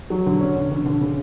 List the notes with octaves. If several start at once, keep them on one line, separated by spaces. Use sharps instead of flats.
F#3
D3
C#4
D3
D3
D3
C#3